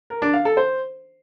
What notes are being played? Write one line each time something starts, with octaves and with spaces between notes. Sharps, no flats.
A#4
D4
F5
A4
C5